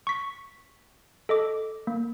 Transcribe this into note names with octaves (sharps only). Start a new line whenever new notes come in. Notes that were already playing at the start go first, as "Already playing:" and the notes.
C#6 B6
A4 D#5 D6
A#3